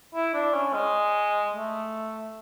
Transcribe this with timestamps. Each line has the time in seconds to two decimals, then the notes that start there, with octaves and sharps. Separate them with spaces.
0.15 E4
0.34 D4
0.54 C#4
0.74 G#3
1.54 A3